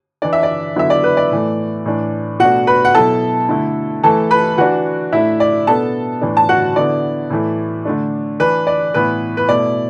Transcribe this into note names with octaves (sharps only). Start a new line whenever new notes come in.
E3 D4 D5
E5
D5
D3 F#3 B3 E4 E5
D5
B4
D5
A2 E3 A3
A2 E3 D4
B2 A3 D4 F#4 F#5
B4 B5
F#5
B2 F#3 B3 E4 A4 A5
D3 A3 E4
E3 A3 E4 A4 A5
B4 B5
E3 D4 F#4 F#5
A2 A3 D4 E4 E5
D5
B2 B3 D4 A4 A5
A2 E3 D4
A5
F#4 F#5
D3 B3 E4 D5
A2 E3 A3 E4
D3 A3 D4
E3 D4 B4
D5
A2 E3 B3 E4 B4
B4
B2 A3 E4 D5